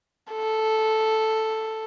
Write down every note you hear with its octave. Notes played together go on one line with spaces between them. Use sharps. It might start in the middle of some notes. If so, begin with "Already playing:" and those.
A4